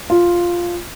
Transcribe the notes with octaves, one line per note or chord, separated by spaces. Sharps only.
F4